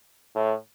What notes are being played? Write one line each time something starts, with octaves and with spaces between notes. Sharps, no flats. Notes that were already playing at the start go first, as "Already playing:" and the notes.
A2